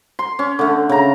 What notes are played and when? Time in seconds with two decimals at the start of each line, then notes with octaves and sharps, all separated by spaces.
0.19 C6
0.39 C#4
0.59 D3 A3
0.89 C#3 A#5